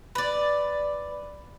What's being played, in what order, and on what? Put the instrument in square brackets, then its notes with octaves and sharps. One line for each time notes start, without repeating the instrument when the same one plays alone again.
[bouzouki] B4 D5